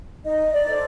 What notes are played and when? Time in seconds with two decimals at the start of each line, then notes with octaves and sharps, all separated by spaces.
0.23 D#4 D#5
0.53 D5
0.66 A4 C5